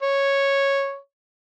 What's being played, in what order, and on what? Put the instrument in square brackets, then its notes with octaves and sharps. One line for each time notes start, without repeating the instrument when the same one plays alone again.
[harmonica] C#5